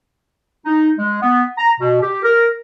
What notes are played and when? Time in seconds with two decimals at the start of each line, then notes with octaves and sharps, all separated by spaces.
0.66 D#4
0.99 G#3
1.22 B3
1.58 A#5
1.79 B2
2.01 G4
2.23 A#4